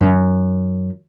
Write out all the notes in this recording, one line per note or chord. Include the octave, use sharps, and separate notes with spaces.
F#2 D#3